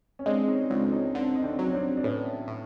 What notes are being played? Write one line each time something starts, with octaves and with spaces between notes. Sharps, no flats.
C#4
G#3 C4 D4
C#4 D#4
C#2 C4 D4
D4
C#4 D#4
D3 C4 D4
D#4
C4 D4
F#3
C#4
C4 D4
D4
A2 B3 C#4
A2